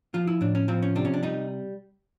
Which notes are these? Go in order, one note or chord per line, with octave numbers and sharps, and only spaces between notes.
F3 F4
E4
A2 D4
C#4
F3 C4
C#4
C3 D4
C#4
D4
G3 D#4